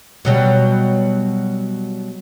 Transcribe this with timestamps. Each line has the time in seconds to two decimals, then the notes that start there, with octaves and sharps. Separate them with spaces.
0.25 B2 F#3 G3